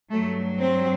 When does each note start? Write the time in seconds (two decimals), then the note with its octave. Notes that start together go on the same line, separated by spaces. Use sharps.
0.12 G2 F#3 A3
0.60 C4